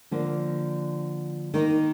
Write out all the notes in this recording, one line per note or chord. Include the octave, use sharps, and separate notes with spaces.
D3 F3 A#3
D#3 A#3 D#4